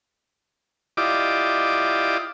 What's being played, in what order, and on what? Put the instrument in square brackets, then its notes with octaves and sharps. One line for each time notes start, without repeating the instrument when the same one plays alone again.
[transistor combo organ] E4 F4 G4 D5 D#5 D6